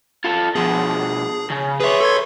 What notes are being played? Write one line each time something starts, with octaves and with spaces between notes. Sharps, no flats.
F4 A4
B2 F3 G#4
C#3
G#4 B4 C#5 E5
A4 C6 G#6